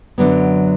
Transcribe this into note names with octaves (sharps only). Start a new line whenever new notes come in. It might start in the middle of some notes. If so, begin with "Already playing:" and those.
F#2 D3 F#3 B3